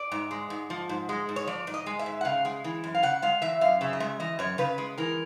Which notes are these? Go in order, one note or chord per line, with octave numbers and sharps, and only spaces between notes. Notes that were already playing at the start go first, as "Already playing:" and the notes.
Already playing: D5
G#2
G#3
G#2
F3
G#2
G#3
G#2
C#5
F3 D5
G#2
D#5
G#3
E5
G#2
F#5
C#3 F5
G#3
E3
F#2
F5
C#3 F#5
G#3 F5
E3 E5
F#2 F5
C#3 E5
D#5
G#3 E5
E3 D#5
F#2 C#5
C#3 B4
G#3
E3 A#4